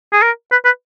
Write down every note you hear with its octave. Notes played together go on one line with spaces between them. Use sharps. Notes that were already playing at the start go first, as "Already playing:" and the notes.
G#4
A#4
B4
B4